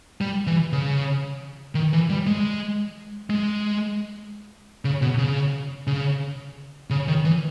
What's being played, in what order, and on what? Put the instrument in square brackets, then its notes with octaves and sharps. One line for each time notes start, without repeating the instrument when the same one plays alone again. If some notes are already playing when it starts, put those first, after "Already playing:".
[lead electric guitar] G3
E3
C#3
D#3
E3
G3
G#3
G#3
C#3
B2
C#3
C#3
C#3
D#3
E3